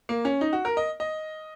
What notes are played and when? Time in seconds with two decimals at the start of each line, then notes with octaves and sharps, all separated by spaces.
0.09 A#3
0.25 C#4
0.41 D#4
0.53 F#4
0.65 A#4
0.77 D#5
1.00 D#5